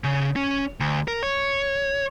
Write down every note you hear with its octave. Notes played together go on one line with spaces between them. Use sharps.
C#3
C#4
D2
A#4
C#5